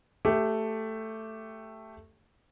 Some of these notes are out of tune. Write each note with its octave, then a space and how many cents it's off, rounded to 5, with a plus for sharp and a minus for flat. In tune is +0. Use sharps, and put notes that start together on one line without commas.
A3 +5 G4 +0